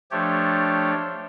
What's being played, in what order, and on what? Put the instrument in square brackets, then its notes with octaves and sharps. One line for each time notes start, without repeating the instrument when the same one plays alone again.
[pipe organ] F3 A3 D4 G4 C#5